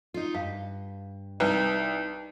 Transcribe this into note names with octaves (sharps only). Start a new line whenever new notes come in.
D#4 F4
G2 F5
C2 D#4 B4 A5